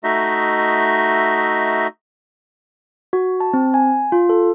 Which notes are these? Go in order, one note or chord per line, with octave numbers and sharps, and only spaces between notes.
A3 D#4 F#4 D#5 E5
F#4
A5
C4
G#5
F4
A4